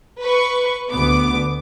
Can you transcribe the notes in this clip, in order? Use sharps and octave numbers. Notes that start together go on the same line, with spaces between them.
B4 C#6
D2 B3 D6